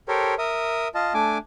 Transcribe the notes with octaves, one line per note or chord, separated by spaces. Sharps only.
G4 A4 A#4 C5 C#5
A#4 E5 D#6
F4 D#5 A5
A3 D4 G#5 D6